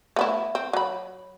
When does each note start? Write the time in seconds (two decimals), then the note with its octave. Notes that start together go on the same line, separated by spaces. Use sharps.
0.16 A3 B3 E4
0.55 C4
0.73 F#3 B5